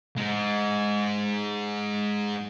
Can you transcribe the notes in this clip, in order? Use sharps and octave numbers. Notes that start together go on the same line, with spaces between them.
G#3 D#4